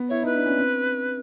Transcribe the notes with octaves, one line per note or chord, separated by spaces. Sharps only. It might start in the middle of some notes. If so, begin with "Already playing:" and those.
Already playing: B3
E4 C#5
D#4 B4
D4
C#4
C4